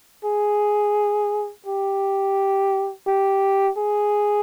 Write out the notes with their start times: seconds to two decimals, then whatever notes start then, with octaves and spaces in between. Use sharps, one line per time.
0.25 G#4
1.66 G4
3.07 G4
3.78 G#4